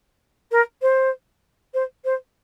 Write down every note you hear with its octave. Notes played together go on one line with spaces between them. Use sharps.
A#4
C5
C5
C5